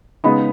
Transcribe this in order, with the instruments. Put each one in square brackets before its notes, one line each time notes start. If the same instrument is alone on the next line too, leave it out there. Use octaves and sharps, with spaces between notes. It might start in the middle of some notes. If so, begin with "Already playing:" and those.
[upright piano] C#3 G#3 B3 D#4 B5